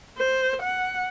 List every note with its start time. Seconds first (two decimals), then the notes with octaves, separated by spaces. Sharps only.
0.18 C5
0.62 F#5